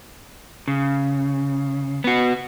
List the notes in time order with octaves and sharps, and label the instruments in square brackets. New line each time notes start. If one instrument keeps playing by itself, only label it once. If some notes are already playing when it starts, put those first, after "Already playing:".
[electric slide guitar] C#3
B3 F#4